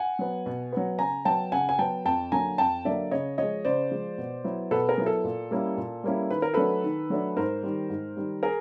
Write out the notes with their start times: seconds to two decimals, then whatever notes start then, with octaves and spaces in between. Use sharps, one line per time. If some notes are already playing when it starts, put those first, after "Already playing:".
Already playing: F#5 G#5
0.19 F#3 B3
0.46 B2
0.72 F#3 B3
0.99 C#3 G#5 A#5
1.25 F#3 B3 G5 A5
1.52 C#3 F#5 G#5
1.69 G#5
1.79 F#3 B3 G5 A5
2.05 F2 G5 A5
2.32 D3 F#3 A#3 G#5 A#5
2.58 F2 G5 A5
2.85 D3 F#3 A#3 D5 E5
3.11 C#3 C#5 D#5
3.38 F3 G#3 C#5 D#5
3.65 C#3 C5 D5
3.91 F3 G#3
4.18 B2
4.44 F#3 B3 E4
4.71 B2 A4 B4
4.89 G#4 A#4
4.98 F#3 B3 E4
5.06 A4
5.24 A#2
5.51 G3 A#3 C#4 E4
5.77 A#2
6.04 G3 A#3 C#4 E4
6.30 D#3 B4
6.42 A#4
6.54 F#3 A3 D4 A4 B4
6.84 D#3
7.10 F#3 A3 D4
7.37 G#2 A#4 C5
7.63 D#3 G3
7.89 G#2
8.17 D#3 G3
8.43 G#4 A#4